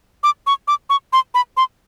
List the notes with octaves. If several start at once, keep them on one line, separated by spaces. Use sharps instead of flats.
D6
C#6
D6
C#6
C6
B5
C6